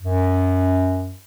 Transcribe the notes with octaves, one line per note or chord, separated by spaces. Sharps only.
F#2